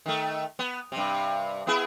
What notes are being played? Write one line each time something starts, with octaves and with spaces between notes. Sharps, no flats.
D#3 A3
B3
G2 C3
B3 E4 G#4